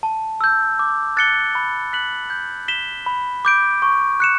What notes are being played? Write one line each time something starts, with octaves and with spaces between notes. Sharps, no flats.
A5
E6 G6
D6
F#6 A6 C#7 G7
B5
F#6 B6 F#7
G6
B6 E7 G7
B5
D6 G6 D7
C#6
F#6 C#7 E7